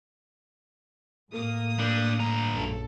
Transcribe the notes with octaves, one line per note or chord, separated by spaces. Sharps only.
A2 A#3 D#6
G3 D4
G2 A#5
A#1 F#2 A4